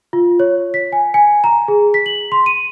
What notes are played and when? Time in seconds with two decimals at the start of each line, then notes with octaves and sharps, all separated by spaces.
0.13 F4
0.40 C#5
0.74 B6
0.92 G#5
1.14 G#5
1.44 A#5
1.68 G#4
1.94 B6
2.06 F#7
2.32 C6
2.46 D#7